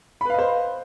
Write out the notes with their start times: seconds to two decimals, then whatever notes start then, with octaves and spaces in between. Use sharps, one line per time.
0.21 B5
0.25 B4
0.30 F5
0.34 D#5
0.39 C5